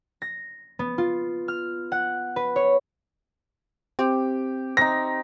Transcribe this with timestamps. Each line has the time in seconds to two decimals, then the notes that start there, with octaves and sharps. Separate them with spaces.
0.22 A#6
0.79 B3
0.98 F4
1.48 F6
1.92 F#5
2.36 B4
2.56 C#5
3.99 C4 G4
4.77 C4 D#4 A#6